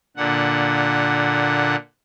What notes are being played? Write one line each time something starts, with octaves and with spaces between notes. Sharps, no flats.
A#2 D3 F#5